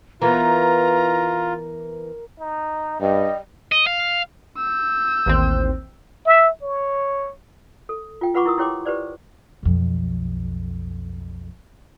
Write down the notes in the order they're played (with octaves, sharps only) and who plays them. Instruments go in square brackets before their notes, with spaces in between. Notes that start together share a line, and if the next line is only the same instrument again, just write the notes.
[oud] E3 B3 [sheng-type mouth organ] F4 [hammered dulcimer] A#4 [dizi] A#5
[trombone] D#4
[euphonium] G2 [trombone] G3 [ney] D#5
[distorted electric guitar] D#5
F5
[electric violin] E6 G6
[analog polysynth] A1 D#2 C4
[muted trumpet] E5
C#5
[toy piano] A4
F4 G5
F4 B4 F#5 B5 C#6 D6
E4 A#4 D#6
E4 G4 C#5 G5 C6 D6
G4 B4 C5 D5
[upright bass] B1 F2